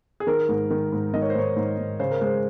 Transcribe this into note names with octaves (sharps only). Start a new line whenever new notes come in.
G#4
D#3 A#4
G#2
D#3
G#2
D#3 D#5
C#5
C5
G#2 C#5
G#2
G#2
C#3 C5
A#4
G#3 C5